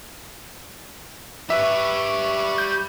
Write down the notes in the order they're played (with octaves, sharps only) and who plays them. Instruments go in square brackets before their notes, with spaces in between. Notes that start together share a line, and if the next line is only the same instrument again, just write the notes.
[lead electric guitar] G4 B4 [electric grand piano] E5 [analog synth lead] C#6
[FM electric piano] G6